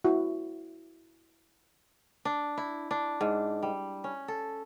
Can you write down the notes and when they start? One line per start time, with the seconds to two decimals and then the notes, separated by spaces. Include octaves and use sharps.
0.04 E4 F#4
2.25 D4
2.58 E4
2.91 D4
3.21 G#2
3.63 G3
4.04 C#4
4.28 A4